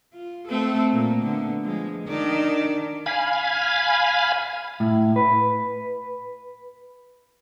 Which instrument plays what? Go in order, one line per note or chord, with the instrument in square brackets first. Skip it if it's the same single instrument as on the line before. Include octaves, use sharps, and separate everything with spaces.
[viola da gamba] F4
A3 C4 A4
A#2 A#3
D3 B3
F3 G#3
D#3 D4 D5
[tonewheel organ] F5 G#5 B5
[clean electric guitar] A2
B4